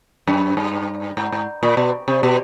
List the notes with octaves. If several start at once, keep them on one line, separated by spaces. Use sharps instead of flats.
F#2
G2
G#2
G#2
A#2
B2
C3
B2